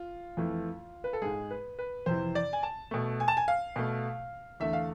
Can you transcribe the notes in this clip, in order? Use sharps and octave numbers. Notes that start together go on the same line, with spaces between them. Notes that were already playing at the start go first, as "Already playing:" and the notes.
Already playing: F4
F2 E3 A3
B4
A4
G#2 G#3 G#4
B4
B4
F2 C3 E3 C5
D5
G#5
A5
B2 A3
G#5
A5
G#5
F5
B2 A3
E2 D3 A3 E5
F5